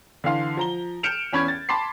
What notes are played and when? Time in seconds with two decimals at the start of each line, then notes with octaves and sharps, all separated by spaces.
0.24 D3 E3 F5 C6
0.57 F3 A#5 G7
1.03 F6 G6 C#7 D7 E7 F7
1.33 E2 C#4 B5 C#6 G#6
1.48 A6
1.69 A5 B5 C6 D6 C7